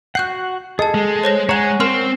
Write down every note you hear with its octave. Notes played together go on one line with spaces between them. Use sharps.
F#4 F#5 F#6 G6 C7
G#4 A4 D#5 A5
G#3
C5 C#5 A#6
G#3 C#5 F#5 G#5 A#5 E7
C4 A#4 C6 F6